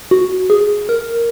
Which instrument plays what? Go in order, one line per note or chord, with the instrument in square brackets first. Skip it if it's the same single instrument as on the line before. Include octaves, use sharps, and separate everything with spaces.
[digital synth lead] F#4
G#4
A#4